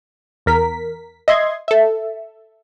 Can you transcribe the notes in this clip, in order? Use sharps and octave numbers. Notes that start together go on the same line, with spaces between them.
E2 A#4 B6
D#5 E5 C6 G#6
A4 E5